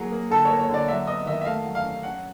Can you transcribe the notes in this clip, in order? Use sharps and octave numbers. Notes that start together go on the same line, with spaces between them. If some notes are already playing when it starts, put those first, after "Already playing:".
Already playing: F#3 A#3 G#4
A#3
D3 A4
C#5
A#3
C#5
D3 D5
F#3 E5
B3 D#5
D#3 E5
E5
A3 F5
F#3
F5
C#4
C#4 F#5